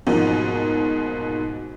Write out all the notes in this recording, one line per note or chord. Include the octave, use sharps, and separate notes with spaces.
G#2 B2 F3 F#3 A#3